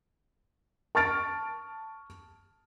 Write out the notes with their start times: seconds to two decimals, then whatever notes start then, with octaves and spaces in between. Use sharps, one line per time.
0.95 A5 C#6 F6 A6 D7